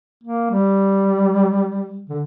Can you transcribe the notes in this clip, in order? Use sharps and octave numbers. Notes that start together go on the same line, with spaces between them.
A#3
G3
D3